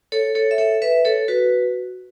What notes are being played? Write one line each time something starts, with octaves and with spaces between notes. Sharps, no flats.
A4 C#5
A4 C#5
E5
A4 C#5
B4 E5
A4 C#5
F#4 B4